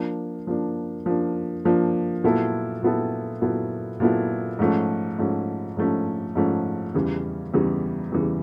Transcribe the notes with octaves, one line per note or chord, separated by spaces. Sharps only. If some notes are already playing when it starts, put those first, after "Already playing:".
Already playing: F3 A#3 D4
F3 A#3 D4
F3 A#3 D4
F3 A#3 D4
A#2 F#3 B3 E4 A4
A#2 F#3 B3 E4 A4
A#2 F#3 B3 E4 A4
A#2 F#3 B3 E4 A4
G#2 F3 A3 C#4
G#2 F3 A3 C#4
G#2 F3 A3 C#4
G#2 F3 A3 C#4
E2 C#3 E3 G3
E2 C#3 E3 G3
E2 C#3 E3 G3